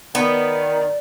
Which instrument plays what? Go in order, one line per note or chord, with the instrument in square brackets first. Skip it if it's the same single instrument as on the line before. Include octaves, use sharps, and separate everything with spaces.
[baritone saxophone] D#3 [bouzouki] B3 [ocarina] D5